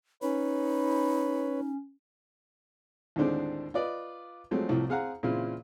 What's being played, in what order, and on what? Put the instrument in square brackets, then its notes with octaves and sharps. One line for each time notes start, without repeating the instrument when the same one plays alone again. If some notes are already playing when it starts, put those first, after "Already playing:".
[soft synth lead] C#4 [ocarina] D#4 [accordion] B4 C#5 B5
[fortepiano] D#2 A2 D3 G#3 C4 D4
F4 B4 D5 D#5
F3 F#3 G#3 A3 C4
C2 A2 F3
C4 G#4 F5 F#5 A#5
A#2 C#3 E3 C4 E4 F4